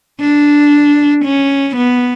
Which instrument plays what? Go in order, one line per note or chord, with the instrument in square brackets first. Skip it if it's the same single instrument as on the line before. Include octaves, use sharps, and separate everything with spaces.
[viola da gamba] D4
C#4
B3